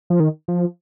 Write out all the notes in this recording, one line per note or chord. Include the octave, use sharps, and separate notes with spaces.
F3
D#3
F3